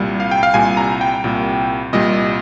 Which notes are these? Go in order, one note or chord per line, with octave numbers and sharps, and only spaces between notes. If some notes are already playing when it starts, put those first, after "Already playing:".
Already playing: C2 A#2 G3
F5
G5
F5
C2 A#2 G3 G#5
A#5
G5
C2 A#2 G3
C2 A#2 G3 D#5